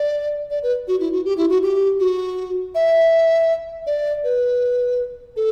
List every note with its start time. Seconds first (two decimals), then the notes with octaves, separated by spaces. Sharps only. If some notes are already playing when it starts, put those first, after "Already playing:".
Already playing: D5
0.50 D5
0.63 B4
0.88 F#4
1.00 E4
1.12 F#4
1.25 G4
1.37 E4
1.50 F#4
1.63 G4
2.00 F#4
2.75 E5
3.86 D5
4.24 B4
5.36 A4